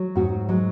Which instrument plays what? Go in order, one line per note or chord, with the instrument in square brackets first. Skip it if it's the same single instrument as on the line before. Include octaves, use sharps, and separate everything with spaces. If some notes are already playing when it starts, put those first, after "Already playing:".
Already playing: [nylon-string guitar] F#3
G#2 F#4
F#3 G#3